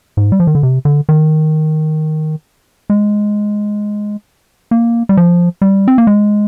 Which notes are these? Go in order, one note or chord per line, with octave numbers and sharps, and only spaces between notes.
G#2
G3
F3
D#3
D3
C3
D3
D#3
G#3
A#3
G3
F3
G3
C4
A#3
G#3